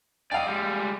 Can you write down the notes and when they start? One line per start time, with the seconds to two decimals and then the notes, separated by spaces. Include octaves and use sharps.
0.31 D5 D#5 F5 G5
0.47 G3 G#3